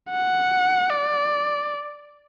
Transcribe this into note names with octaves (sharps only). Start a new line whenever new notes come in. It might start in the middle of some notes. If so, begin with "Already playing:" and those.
F#5
D5